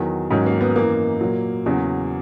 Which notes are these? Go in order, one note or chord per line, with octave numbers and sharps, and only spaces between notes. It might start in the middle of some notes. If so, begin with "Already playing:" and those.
Already playing: E2 D#3 F#3
G#2 D#3 F#3 C#4
A#3
B3
F#2 E3 A#3
A#2 F#3
E2 C#3 F#3